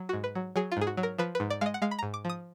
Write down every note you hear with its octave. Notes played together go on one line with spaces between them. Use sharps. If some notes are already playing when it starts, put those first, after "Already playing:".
Already playing: F#3
G#2 F#4
B4
F#3
F#3 G#4
F4
G#2 G#4
F#4
F#3
A#4
F3 B4
B4
G#2
D5
G#3 D#5 F5
F#5
G#3 F5
B5
G#2 A#5
D6
F3 D#6